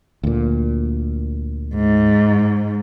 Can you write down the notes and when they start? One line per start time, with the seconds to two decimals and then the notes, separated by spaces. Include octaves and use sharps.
0.24 D2 A#2
1.75 G#2